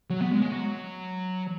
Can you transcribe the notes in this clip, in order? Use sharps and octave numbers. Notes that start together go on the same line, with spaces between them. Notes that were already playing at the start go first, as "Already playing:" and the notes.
F#3
B3
G#3
G#3
F#3